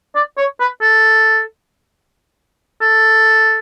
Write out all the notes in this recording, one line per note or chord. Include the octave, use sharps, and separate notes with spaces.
D5
C#5
B4
A4
A4